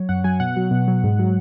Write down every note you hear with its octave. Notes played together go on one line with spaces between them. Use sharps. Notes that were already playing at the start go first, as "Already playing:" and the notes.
Already playing: F#3 C#5
F#2 F#5
F#3 G#5
B2 F#5
F#3
B2
F#3
G#2
F#3